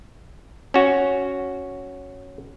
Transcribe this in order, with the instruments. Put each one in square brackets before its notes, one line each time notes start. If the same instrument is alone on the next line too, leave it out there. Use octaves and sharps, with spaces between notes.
[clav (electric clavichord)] C#4 F#4